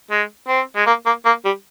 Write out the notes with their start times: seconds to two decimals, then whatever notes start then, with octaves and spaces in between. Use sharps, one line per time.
0.11 G#3
0.48 C4
0.76 G#3
0.86 A#3
1.06 A#3
1.25 A#3
1.45 G3